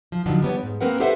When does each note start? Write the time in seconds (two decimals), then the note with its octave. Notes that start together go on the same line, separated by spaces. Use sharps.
0.12 F3
0.26 G2 D3 D#3 F3 F#3
0.42 G3 B3 C#5
0.63 G#2
0.81 A#3 C4 A#4 B4 F#5
1.00 G4 A4 B4 C5 E5 F#5